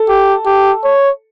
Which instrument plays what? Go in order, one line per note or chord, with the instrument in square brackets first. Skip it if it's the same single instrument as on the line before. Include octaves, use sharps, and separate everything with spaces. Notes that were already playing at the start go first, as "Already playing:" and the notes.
Already playing: [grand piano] A4
[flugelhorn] G4
G4
C#5